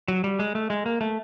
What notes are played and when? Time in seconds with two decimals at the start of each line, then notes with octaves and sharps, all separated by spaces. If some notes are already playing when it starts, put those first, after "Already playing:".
0.08 F#3
0.24 G3
0.39 G#3
0.55 A3
0.70 G#3
0.86 A#3
1.01 A3